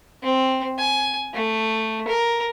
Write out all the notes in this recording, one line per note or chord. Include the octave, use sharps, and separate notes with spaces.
C4
G#5
A3
A#4